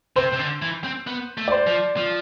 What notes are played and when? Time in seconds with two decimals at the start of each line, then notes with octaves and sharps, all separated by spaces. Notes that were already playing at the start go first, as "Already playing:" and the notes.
0.16 C3 C5
0.32 C3
0.39 D3
0.62 E3
0.84 C4
1.07 B3
1.37 A3
1.48 D5
1.52 C5
1.67 F3
1.97 F3